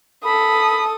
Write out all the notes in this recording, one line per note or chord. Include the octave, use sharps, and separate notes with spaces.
A4 B5 D#6